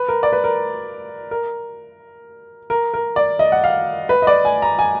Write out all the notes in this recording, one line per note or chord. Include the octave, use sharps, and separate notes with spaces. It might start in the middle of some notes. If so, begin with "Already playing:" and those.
Already playing: B4
A#4
D5
B4
A#4
A#4
A#4
A#4
D5
D#5
F#5
F5
B4
D#5
D5
G#5
A#5
G#5